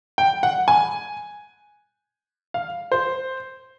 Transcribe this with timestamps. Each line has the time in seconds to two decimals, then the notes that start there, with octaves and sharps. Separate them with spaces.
0.18 G5
0.43 F#5
0.68 G#5
2.54 F5
2.92 C5